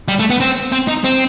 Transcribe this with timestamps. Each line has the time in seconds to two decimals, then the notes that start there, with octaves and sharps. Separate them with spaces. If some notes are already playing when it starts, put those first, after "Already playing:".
0.08 G3
0.20 A3
0.30 B3
0.41 C4
0.72 C4
0.87 D#4
1.04 C4